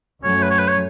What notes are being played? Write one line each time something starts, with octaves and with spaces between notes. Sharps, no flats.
F#2 F#3 A3 C#4 C#5
B4
C#5
B4
C#5